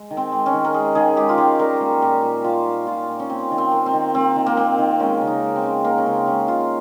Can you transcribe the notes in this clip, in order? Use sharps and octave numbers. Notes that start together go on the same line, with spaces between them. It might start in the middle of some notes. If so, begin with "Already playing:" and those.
Already playing: G#3
D#3
C4
G#3
C#4
D#3
A#4
G#3 G#4
D#3 G#4
G#3 G4
F4
D#3 G4
G3 A#4
A#3
A#2 G4
A#2
G3 F4
A#3
A#2 F4
A#2
C#4
A#3 C4
D#3
C4
A#3
C4
D#3
A#3 C4
D#3
A#3
A#3 C4
D#3
G#3 C#4
C#3
D#4
G#3
C4
C#3
G#3 A#3
C#4
C#3 C4
G#3 C#4
C#3 F4